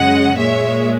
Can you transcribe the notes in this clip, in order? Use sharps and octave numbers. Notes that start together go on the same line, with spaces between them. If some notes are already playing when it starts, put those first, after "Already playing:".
Already playing: F#2 C#3 G#3 D#5 F#5
A#2 G#3 C#5 E5